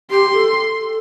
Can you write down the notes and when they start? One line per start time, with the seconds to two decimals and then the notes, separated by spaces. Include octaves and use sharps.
0.11 G4 C6
0.33 A4
0.78 A4